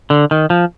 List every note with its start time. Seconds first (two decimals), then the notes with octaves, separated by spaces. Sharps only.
0.10 D3
0.31 D#3
0.50 F3